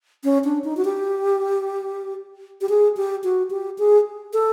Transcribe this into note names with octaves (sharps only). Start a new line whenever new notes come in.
C#4
D4
D#4
F#4
G4
G4
G#4
G4
F#4
G4
G#4
A4